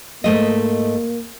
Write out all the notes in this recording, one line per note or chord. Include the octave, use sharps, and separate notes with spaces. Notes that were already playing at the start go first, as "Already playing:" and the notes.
G#2 A3 A#3 D#5